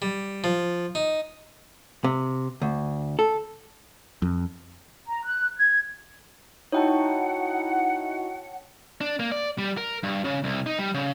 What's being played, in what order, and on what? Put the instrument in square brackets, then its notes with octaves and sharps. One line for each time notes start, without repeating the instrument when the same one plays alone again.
[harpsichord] G3
F3
D#4
[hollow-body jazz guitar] C3
D2
A4
[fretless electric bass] F2
[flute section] A#5
F#6
G#6
[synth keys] D#4 E4 F#4 [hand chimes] C#5 G5 A5 [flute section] F#5
[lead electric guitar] D4
A#3
D5
G3
A#4
G2
C#3
C2
D#4
G3
C#3